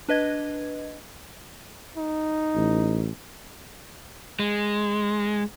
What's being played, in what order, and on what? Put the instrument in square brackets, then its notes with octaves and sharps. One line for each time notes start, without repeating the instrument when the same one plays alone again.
[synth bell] D4 B4 D#5 G#6
[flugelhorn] D#4
[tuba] A1
[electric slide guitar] G#3